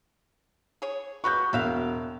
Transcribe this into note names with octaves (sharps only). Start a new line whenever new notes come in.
G#4 C#5
G#3 F#4 B4 C#6 G6
E1 F#4 E5 F5